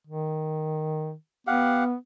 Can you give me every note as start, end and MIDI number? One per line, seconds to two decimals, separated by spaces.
0.07 1.14 51
1.47 1.95 59
1.47 1.84 67
1.47 1.84 77
1.47 1.84 78